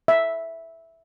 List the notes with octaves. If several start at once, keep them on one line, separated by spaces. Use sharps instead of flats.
E5